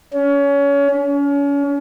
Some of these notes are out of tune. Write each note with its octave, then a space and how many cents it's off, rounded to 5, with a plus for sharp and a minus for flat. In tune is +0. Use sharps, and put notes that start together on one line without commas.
C#4 +25
C#4 +35